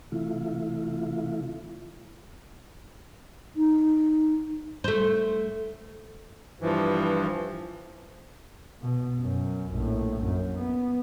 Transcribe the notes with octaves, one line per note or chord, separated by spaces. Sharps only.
C3 E3 A3 E4 F4
D#4
A3 C5
G2 E3 F3
B2
F#2
A#1 A2
F#2
B3